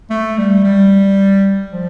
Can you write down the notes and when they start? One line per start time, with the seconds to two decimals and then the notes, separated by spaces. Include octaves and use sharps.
0.10 A3
0.38 G3
0.64 G3
1.72 F3